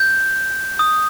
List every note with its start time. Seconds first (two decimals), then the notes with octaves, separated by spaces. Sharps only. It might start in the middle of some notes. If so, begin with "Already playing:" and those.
Already playing: G6
0.79 D#6